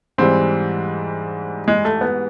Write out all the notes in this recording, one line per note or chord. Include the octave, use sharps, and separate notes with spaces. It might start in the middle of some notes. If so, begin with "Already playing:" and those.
G#2 E3 G3 C4
G#3
A3
B3